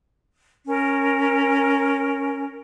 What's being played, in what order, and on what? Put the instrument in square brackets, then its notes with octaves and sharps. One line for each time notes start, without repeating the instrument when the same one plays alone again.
[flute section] C#4 A#4